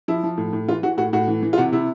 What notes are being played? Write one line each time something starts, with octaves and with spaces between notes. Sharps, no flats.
F3 E4
F3
A2
A2
E3 F4
E3 F#4
A2 F#4
A2 F#4
E3
E3
F4
C3 F#4
C3 E4